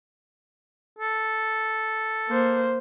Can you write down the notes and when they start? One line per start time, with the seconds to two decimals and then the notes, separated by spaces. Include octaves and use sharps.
0.98 A4
2.29 A#3 C5